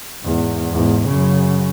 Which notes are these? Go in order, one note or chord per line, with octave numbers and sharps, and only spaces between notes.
E2 G#2
E2 G#2
F#2 C#3